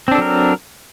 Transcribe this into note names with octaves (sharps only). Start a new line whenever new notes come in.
F#3 C4 D4 A4 A#4